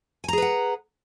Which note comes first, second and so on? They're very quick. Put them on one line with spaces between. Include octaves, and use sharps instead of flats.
G#5 A#5 G#4 B4 F#5